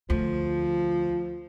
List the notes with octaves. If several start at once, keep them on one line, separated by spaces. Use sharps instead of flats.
D2 F3